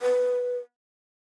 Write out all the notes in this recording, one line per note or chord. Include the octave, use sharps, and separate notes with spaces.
B4